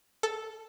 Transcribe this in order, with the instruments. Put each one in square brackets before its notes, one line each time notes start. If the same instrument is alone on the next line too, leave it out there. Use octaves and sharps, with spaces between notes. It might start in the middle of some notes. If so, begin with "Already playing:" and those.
[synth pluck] A4